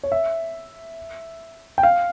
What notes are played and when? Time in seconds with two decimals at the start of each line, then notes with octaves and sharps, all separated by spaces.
0.03 C#5
0.12 E5
1.78 G5
1.83 F5